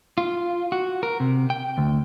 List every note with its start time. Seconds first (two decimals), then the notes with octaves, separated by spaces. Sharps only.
0.18 F4
0.72 F#4
1.03 A#4
1.20 C3
1.50 G5
1.78 D2